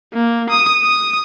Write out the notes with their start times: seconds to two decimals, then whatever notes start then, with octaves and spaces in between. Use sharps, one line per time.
0.13 A#3
0.50 D#6
0.82 D#6